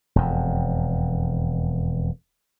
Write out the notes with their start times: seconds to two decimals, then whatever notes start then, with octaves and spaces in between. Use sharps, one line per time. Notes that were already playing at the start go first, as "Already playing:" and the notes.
0.16 E1 F2